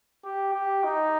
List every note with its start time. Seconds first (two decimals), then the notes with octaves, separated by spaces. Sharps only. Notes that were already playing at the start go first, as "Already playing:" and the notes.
0.24 G4
0.54 G4
0.84 D#4